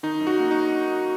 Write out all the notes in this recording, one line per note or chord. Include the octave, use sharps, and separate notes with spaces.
D#3 D#4
F#2
F#4
A#3
D#4